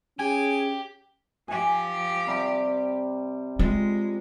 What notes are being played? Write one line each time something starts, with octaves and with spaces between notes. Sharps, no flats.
C#4 G4 G#4 G#5
F3 G4 G#5
C3 G3
G#3 F4